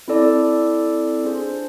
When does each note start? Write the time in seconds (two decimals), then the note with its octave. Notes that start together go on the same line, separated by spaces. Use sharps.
0.08 C4 E4 A4 D5
1.25 D4 F4 G#4 C5